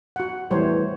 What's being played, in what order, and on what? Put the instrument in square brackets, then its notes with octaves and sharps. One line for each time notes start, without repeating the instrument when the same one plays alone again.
[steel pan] F#4 F#5
[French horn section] E2 A2 E3 [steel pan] G3 C5 C#5